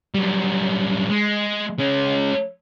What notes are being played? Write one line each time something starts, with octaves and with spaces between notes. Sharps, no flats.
F#2 G3
G#3
G#3 C#4